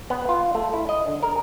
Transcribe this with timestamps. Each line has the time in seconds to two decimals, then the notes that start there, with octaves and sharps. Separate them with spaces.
0.10 B3
0.29 F4
0.55 A3
0.74 E4
0.89 D#5
1.07 D3
1.23 A#4